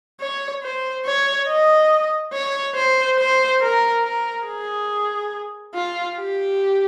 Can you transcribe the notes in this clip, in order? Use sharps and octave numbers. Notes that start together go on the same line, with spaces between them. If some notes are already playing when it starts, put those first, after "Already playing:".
C#5
C5
C#5
D#5
C#5
C5
C5
A#4
A#4
G#4
F4
G4